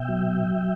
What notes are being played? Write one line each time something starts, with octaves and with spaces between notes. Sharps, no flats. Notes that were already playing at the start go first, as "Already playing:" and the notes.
Already playing: B2 E5 G5
F#3